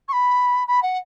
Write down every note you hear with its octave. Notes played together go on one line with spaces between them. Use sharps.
C#6
B5
B5
F#5